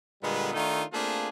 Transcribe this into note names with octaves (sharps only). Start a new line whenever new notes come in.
A#2 D3 G3 G#3 B3
D#3 A3 D4 D#4 F4 A4
A3 A#3 C4 D4 F4 G#4